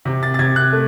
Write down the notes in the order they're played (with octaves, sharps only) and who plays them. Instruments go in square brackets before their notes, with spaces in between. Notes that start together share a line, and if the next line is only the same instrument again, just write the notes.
[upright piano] C3
A6
A6
C3 G#6
F#6
A3